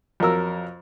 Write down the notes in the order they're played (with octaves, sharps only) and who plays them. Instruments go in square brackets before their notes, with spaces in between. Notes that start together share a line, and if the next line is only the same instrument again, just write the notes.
[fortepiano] F2 F#3 A#4 E6